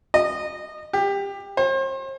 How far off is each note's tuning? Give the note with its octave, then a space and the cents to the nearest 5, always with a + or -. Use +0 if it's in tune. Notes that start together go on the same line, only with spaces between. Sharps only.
D#5 -20
G4 +20
C5 +40